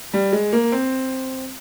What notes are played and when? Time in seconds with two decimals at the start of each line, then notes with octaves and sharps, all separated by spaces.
0.13 G3
0.32 G#3
0.53 A#3
0.72 C4